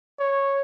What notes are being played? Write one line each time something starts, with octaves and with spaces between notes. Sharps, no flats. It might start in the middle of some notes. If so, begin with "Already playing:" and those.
C#5